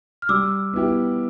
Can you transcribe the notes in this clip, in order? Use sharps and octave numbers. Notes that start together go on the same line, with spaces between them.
F6
G3 D6 E6
B3 E4 G4